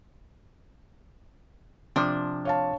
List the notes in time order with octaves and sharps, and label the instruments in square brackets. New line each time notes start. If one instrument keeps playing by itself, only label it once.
[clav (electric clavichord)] C3 F3 [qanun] D4
[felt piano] C#5 F5 A5